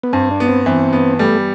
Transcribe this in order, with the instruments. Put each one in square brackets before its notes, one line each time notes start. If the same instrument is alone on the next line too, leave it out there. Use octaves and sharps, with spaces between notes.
[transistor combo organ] B3
[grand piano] G2 [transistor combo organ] C4
[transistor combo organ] D4
[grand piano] B3
[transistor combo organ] C4
[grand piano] E3 [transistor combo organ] C4
[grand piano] B3
[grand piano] G3 [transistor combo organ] A3